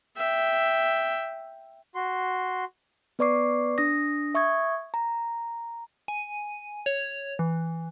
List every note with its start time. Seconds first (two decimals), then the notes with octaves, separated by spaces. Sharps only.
0.17 E5 G5
1.95 F#4 C6
3.19 B3 B4 D5 C#6 D6 C7
3.78 D4 D#6 A#6
4.35 E5 C#6 D#6 G#6
4.94 A#5
6.08 G#5
6.86 C#5
7.39 E3